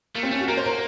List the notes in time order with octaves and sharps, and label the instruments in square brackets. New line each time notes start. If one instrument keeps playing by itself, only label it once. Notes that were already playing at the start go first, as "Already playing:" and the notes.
[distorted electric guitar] A3 [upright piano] A#3
[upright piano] C4
[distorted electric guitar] A3 [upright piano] C#4
[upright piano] F#4
[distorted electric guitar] A#3 [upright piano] A#4
[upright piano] C5
A#4